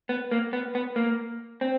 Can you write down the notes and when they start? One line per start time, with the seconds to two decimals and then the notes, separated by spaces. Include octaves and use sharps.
0.09 B3
0.31 A#3
0.53 B3
0.75 B3
0.96 A#3
1.61 C4